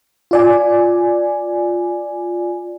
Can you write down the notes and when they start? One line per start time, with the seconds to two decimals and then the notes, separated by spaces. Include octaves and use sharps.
0.31 F4 D5 G#5